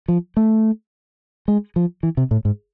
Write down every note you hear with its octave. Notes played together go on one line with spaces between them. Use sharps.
F3
A3
G#3
F3
E3
C3
A2
G#2